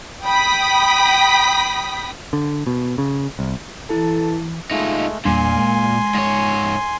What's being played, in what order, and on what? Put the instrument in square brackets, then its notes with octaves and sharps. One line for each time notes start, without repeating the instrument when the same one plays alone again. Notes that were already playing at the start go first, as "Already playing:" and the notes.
[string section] G5 B5 D#6 B6
[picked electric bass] D3
B2
C#3
C2
[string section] E3 [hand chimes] E4 A5 [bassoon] A4
[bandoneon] G#3 A3 [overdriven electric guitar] D#4 F4
[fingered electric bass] E2 G3 D4 [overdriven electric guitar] A#2 [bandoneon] G#5 C6
[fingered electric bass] G#3
[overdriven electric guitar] G#2 C#5